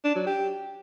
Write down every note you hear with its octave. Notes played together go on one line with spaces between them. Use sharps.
D4
F#3
G4